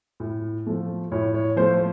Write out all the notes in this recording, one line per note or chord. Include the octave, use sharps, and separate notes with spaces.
A2
F3 A3
A2 C#5
C#5
F3 A3 C5